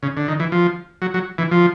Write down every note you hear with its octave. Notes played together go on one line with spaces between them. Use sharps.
C#3
D3
D#3
E3
F3
F#3
F#3
E3
F3